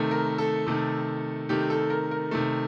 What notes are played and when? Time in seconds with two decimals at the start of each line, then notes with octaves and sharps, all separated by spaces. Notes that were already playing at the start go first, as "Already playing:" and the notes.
Already playing: C3 D#3 A3
0.11 A#4
0.38 A4
0.67 C3 D#3 A3
1.49 C3 D#3 A3 G4
1.70 A4
1.90 A#4
2.11 A#4
2.31 C3 D#3 A3